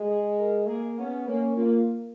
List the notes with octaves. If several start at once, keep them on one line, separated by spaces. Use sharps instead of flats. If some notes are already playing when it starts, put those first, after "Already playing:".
Already playing: G#3
G#4
A#4
A#3 G#4
B3 C#4
A#3 C#4
A#3 F4